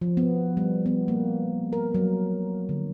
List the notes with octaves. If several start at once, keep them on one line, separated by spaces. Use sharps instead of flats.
F3
B3
G3
B3
A#3
A#4
F#3
D3